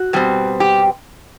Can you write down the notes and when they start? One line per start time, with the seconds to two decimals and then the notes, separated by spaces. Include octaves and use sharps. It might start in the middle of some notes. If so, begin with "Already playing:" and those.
Already playing: F#4
0.13 B2 G3 C4
0.60 G4